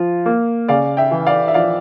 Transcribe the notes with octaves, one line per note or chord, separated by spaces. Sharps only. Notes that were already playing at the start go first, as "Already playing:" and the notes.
Already playing: F3 F4
A#3
C#3 D5 F5
E5 G5
E3
D5 F5
E5
F3 D5 F5